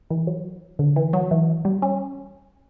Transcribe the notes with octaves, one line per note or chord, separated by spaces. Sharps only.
E3
F#3
D3
E3
F#3
E3
G3
C#4